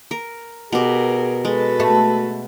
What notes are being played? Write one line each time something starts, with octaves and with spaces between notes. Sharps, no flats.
A#4
B2 G4 G#4 A#4
G#3 F#4 A4 B4
A3